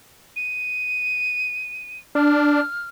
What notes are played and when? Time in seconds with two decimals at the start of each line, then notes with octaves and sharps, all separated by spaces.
0.36 D#7
2.15 D4 F6